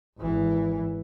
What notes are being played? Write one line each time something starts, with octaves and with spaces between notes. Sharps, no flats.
G#1 E3